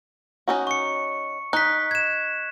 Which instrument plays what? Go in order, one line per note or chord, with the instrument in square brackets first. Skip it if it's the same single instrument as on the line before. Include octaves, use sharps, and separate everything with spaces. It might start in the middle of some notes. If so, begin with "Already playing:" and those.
[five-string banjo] C#4 D#4 F#4
[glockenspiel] C#6 C#7
[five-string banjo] D#4 [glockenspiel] F#6 B6
[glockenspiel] G#6 E7